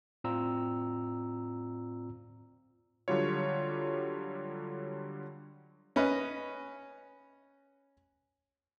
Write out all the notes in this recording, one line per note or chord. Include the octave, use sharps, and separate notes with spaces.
A2 C4 F4 D5 A#5 E6
D3 F#3 G3 F4 C#5
C#4 B4 D#5